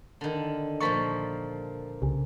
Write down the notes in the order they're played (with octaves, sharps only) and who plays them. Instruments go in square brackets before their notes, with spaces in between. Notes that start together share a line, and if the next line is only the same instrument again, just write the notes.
[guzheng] D3 D#3
[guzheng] A#2 F3 A#3 [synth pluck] C#6 A6 B6
[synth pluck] C2 C#3